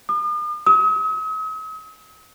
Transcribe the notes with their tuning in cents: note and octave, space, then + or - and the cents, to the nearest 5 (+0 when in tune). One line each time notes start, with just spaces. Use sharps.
D#6 -45
D#6 +45